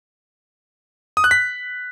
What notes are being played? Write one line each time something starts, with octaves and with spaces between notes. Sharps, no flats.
D#6
F#6
B6